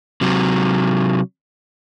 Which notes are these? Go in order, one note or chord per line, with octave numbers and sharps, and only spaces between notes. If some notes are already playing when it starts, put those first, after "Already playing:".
C3 F#3